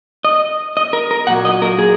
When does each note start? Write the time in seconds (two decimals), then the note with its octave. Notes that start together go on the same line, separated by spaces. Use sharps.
0.25 D#5
0.77 D#5
0.93 A#4
1.11 A#4
1.27 A#2 F#3 F#5
1.45 D#5
1.62 A#4
1.79 G#4